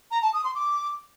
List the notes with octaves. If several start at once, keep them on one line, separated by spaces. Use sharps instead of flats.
A#5
A5
D#6
C6
D6